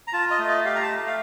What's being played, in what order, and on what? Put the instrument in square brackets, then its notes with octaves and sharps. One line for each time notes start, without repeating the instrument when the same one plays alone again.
[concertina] A#5
F4 A5
D#5
A3
D#5
G4 F5
A#5
A5
A3
F5